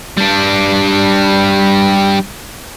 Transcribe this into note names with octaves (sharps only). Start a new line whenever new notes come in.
G3 D4